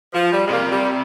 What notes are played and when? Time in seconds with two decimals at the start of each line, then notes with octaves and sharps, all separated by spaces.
0.13 F3
0.32 G3
0.46 G#3
0.51 C3 A#3
0.70 G3